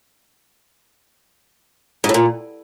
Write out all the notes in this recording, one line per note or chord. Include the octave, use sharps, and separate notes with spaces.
G#2
A2
A#2